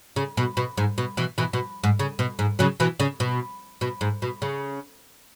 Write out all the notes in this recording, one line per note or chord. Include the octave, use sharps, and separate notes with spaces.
C#3
B2
B2
G#2
B2
B2 E3
B2 E3
B2
G#2
C#3
B2
G#2
C#3 F#3
B2 E3
C#3
B2
B2
G#2
B2
C#3